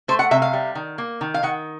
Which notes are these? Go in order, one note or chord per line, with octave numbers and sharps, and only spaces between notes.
A3 C5
F#5
C3 E5
F5
G3
D#3
A#3
D#3
F5
D#3 F#5